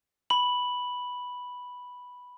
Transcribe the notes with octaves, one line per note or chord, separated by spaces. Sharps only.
B5 F#7